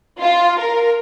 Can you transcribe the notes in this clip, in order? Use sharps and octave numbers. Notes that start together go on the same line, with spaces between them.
F4
A#4